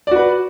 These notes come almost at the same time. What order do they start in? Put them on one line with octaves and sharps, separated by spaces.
D5 F#4 B4